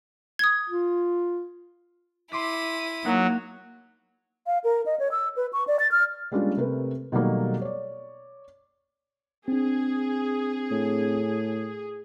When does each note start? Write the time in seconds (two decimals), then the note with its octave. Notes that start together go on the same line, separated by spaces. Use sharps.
0.39 D#6 G#6
0.70 F4
2.32 E4 C6 D6 B6 D#7
3.05 F#3 A#3 D#4 A#4 F#5
4.47 F5
4.64 A#4
4.86 D#5
4.99 C#5
5.11 E6
5.36 B4
5.53 C#6
5.67 D5
5.79 A6
5.91 F6
6.32 G3 G#3 A#3 C#4 D4 F4
6.57 C3 A3 A#4 B4
7.12 B2 D#3 F#3 G3 A3 A#3
7.62 C#5 D5
9.48 C4 D4 G#4
10.71 A2